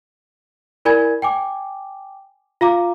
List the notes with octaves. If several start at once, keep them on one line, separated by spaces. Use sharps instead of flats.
E4 A#4 D5 G#5 B5 G#6
G5 G#5 D6
F4 F5 A#5 D6